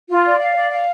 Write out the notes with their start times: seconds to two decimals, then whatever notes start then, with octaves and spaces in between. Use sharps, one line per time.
0.09 F4
0.25 D5
0.40 F5
0.55 D5
0.70 F5